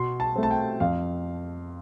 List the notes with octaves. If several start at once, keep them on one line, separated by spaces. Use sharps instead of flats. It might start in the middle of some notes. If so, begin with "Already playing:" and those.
Already playing: B2 C6
A5
A3 C4
A5
G5
F2 F5